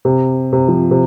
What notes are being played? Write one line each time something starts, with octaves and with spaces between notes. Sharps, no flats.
C3
C3
F3
C3